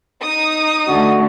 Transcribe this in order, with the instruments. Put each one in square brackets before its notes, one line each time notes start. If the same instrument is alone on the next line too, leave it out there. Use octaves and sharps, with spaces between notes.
[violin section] D#4 D#6
[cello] D3 A3 [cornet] F#4